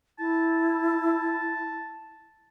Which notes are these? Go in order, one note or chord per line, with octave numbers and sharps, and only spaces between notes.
E4 A5